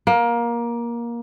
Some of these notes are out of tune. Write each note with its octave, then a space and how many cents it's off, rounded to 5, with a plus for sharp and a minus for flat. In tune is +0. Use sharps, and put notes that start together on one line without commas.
A#3 +20